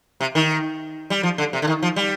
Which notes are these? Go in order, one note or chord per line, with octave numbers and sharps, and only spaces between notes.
C3
D#3
G3
F3
D3
C3
D3
D#3
F3
G3